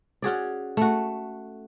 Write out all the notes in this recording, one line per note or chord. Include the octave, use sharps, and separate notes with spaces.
C#4 F#4 G#4 D5
A3 F#4